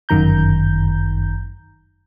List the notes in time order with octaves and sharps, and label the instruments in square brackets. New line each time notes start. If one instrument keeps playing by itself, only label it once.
[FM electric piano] G1 F#2 D#3 A#5 G6